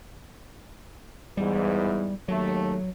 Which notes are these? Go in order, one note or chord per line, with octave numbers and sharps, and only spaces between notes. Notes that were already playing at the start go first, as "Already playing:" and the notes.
E2 G#2 E3 G3
D#2 F#3 A3